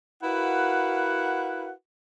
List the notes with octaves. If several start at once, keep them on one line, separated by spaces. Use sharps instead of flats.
E4 F#4 A#4 B4 F5 F#5